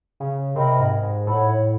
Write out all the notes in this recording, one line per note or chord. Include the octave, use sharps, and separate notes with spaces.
C#3
C3 A#4 D#5 G5 B5
G#2
G#2
A2 A4 C#5 F#5 B5